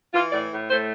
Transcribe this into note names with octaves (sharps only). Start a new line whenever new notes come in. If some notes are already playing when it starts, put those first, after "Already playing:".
E3 F4
A2 D5
A2
A3 C5